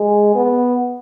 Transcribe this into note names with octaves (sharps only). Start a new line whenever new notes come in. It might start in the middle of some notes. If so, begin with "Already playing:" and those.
Already playing: G#3
B3